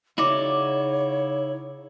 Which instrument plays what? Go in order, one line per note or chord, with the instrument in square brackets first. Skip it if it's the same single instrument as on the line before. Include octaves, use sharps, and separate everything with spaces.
[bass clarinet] C#3 [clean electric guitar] D#4 E4 [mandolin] F#4 D5 [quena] C#5